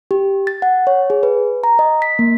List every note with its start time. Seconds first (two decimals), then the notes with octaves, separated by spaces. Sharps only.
0.11 G4
0.47 A6
0.62 F#5
0.87 C#5
1.10 G#4
1.23 B4
1.64 A#5
1.79 D#5
2.02 B6
2.19 A#3